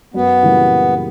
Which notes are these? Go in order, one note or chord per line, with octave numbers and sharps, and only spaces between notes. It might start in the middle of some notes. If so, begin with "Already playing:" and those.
F#2 B3
C#3 E3 G3 A#3